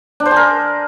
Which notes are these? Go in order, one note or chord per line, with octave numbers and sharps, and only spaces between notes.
D4
C5
G#4
A#4